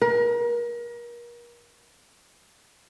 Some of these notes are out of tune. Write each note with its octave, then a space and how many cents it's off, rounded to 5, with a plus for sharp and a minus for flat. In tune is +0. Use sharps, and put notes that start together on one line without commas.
A#4 +35